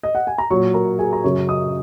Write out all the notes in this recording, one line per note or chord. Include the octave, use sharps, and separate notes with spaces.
D#5
F#5
G#5
A#5
A#2 F#3 C#5 C#6
A#4 A#5
G#4 G#5
A#5
F#2 C#3 F#3 C#5 C#6
D#5 D#6